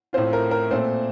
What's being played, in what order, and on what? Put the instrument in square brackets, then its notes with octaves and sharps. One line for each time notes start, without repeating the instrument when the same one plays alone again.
[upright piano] A2 A3 C4 F4 C5
A#4
A#4
A#2 A3 C4 C5